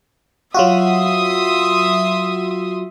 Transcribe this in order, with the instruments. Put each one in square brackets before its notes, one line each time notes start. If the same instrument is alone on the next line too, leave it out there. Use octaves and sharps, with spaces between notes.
[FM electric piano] F#3 F4 F#4 [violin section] E5 C6 D#6